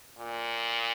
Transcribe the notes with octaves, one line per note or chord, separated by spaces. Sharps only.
A#2